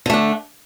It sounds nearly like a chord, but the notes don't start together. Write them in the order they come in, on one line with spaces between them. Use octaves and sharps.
D3 A3 D4